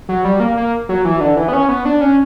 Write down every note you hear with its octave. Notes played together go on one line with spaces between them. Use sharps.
F#3
G3
A#3
A#3
F#3
E3
D3
E3
B3
C#4
B3
D4
C#4